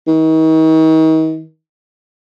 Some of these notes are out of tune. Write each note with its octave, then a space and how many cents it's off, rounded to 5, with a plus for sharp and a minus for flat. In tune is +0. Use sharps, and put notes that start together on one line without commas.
D#3 +40